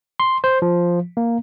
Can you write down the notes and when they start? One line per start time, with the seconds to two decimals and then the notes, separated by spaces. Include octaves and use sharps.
0.20 C6
0.44 C5
0.62 F3
1.17 A#3